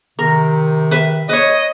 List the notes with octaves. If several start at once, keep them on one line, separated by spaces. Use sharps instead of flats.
C3 D#3 A#4
B4 E5
B4 C#5 D#5